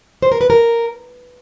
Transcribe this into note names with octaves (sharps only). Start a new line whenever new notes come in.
C5
A#4
B4
A#4